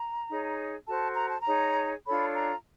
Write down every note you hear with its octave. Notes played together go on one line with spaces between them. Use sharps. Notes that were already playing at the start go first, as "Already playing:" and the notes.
Already playing: A#5
D#4 G#4 C#5
F#4 A4 C5 A5
A#5
A5
A#5
D#4 G#4 C#5
D4 F4 A4 C#5 B5
A#5